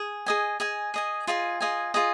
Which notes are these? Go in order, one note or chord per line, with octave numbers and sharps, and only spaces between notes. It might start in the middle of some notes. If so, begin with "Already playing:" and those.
Already playing: G#4
G#4 D#5 G#5
G#4 D#5 G#5
G#4 D#5 G#5
F4 G#4 D#5 G#5
F4 G#4 D#5 G#5
F4 G#4 D#5 G#5